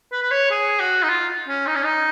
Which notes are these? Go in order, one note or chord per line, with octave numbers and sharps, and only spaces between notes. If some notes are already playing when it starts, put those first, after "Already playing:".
B4
B4
C#5
G#4
F#4
D#4
F4
C#4
D#4
C#4
D#4